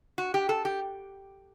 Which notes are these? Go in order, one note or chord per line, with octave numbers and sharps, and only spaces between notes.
F#4
G4
A4
G4